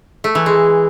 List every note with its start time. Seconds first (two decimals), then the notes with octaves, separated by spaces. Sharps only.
0.24 A3
0.35 E3
0.46 G#3